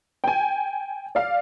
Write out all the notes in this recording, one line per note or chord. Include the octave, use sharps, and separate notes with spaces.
G5 G#5
D5 F5